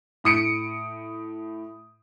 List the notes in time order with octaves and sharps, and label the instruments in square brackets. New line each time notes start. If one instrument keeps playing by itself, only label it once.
[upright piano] A2 D#6 C#7 D7